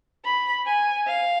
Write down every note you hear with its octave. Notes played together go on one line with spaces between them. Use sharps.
B5
G#5
F5